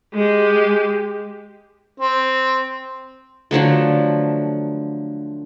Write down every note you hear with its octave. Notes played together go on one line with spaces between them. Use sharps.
G#3 G4
C4
D3 F3 F#3 A3